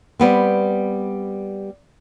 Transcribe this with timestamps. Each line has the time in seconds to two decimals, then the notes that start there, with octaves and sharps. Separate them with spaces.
0.20 G3 B3 C4